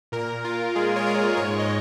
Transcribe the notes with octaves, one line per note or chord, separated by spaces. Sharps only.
A#2 A#4
A#2 F4
G#3 G#4
C#5
G#3 A#4
G#2 C#5
D#5